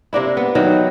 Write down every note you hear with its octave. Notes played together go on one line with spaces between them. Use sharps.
C3 A#3 D4 E4
B3
D#3 E3 F#3